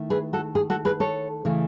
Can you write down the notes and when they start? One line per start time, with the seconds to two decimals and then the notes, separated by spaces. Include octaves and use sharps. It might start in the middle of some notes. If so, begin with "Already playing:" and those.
Already playing: D#3 A3 E4
0.10 G#4 B4
0.33 F#4 A4
0.55 G#4
0.70 F#4 A4
0.85 G#4 B4
1.00 A4 C#5
1.45 C#3 E3 A3 E4